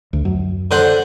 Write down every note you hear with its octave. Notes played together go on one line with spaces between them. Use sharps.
D2
F#2
D3 C5 F#5